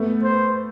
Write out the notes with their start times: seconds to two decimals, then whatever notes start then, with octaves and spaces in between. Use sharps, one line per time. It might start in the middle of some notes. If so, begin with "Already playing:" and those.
Already playing: A3 B3
0.23 C5